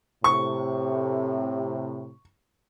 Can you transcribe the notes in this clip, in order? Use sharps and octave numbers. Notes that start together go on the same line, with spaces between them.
A2 C3 C#6